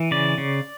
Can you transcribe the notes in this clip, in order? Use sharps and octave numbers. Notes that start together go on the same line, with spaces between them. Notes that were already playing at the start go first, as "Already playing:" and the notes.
Already playing: E3
C#3 D5
C#3